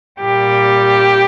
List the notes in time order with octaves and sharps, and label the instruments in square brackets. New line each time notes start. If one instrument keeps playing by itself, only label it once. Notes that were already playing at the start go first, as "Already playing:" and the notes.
[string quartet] A#2 G3 G4